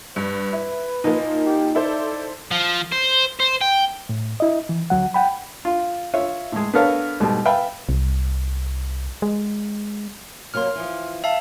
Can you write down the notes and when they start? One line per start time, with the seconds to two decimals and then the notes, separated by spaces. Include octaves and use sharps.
0.16 G2 B4
0.53 E4
1.04 A#2 F3 A#3 D#4
1.45 G4
1.75 E4 A4 C5 D5
2.51 F3
2.92 C5
3.40 C5
3.61 G5
4.09 A2
4.40 E4 D#5
4.69 E3
4.90 D2 F#3 F#5
5.14 F#5 G5 B5
5.65 F4
6.14 F4 C#5 E5
6.52 A2 G#3
6.74 B3 D4 A4 A#4 C#5 F5
7.20 G#2 B2 G3 A3
7.45 B4 E5 F5 G5 A5 B5
7.89 C2
9.22 G#3
10.54 C3 F#3 A#3 C6 F6
10.76 E3 F3
11.24 E5 F5 A5